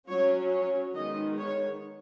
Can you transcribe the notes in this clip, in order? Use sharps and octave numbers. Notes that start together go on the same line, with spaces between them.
F#3 C#4 C#5
C#5
D#3 G#3 B3 D#5
C#5